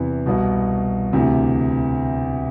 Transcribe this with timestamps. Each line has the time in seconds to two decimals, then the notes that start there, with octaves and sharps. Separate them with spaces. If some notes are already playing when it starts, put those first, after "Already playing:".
Already playing: E2 C3 E3
0.26 C2 B2
1.13 D2 C3 E3